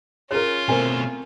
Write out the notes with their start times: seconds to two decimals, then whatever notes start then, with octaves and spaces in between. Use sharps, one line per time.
0.31 C#4 F4 G#4 A#4 C#5
0.69 B2 A3 C4 A#4 C5 G#5